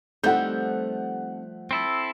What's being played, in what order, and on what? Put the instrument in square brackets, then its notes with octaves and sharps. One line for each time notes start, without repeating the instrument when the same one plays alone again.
[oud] F3 G3 A3 [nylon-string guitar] C4 D#4 A4 [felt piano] F#5 G6
[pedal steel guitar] C4 E4 A4